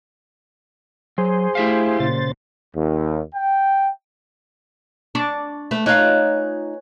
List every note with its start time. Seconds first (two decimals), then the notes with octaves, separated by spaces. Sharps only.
1.18 F#3 G#4 C5
1.55 A3 E4 G4 E5 F5
2.00 A#2 C#3 C5 A6
2.75 D#2
3.34 G5
5.15 D4 C#6 A6
5.71 A3 B4
5.86 D#4 F4 C#5 G#5 F#6